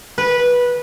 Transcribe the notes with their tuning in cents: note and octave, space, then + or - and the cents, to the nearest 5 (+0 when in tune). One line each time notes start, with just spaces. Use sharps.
B4 -15